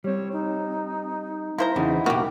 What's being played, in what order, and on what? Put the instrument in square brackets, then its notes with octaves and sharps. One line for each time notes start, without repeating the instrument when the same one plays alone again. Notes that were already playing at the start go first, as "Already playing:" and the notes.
[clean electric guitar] G3 C4 [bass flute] C#5
[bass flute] D#4
[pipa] A#3 C5 A#5 [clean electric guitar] E4
[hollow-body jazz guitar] E2 C#3 [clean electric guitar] D#4 E4
[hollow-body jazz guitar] B1 A#3 [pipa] F#4 G4